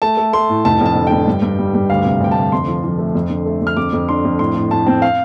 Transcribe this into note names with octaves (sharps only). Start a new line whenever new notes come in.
A3 A5
A3
A3 C6
A2
F1 A5
F2 A5
D3
G5
D3
G2
G2
G3
G2
D2 F5
C3
D2 G5
D2 A5
F2 C6
F3
F3
A3
F2
D3
A3
D3
F6
F2 D6
F2
D4 C6
F2
A2 C6
A2
A2 A5
C4
F5